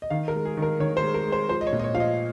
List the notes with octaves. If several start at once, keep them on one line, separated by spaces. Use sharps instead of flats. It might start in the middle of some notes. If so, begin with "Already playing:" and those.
D#5
D#3 F5
A#4
G#3
G#4
D#3
A#4
D#3 C#5
C5
G#3
A#4
G#3
C5
F3 C5
D#5
C#5
A#2
D#5
C#5
F3 F5
D#5